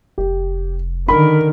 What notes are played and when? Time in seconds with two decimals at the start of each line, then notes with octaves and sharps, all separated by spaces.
0.18 F1 G4
1.08 D3 D#3 A#4 B5